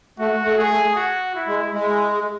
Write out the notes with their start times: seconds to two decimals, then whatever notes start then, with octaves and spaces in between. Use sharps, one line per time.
0.19 A3 F#4
0.44 A3
0.57 G#4
0.70 A3
0.96 F#4
1.35 E4
1.47 G#3
1.73 G#3 E4